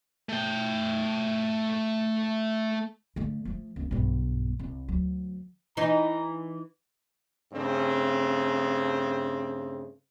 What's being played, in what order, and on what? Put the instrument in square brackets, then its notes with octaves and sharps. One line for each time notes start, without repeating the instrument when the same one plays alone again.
[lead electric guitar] A3 G5
[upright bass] D3 A3
F3 A3
C#2 B3
B1 G2
C2
D2 F#3
[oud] E3 D#4 [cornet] A#5
[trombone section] G2 C#3 A3 C4